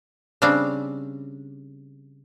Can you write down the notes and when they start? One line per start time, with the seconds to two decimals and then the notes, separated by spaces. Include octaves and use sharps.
0.42 C#3 G3 C4 D4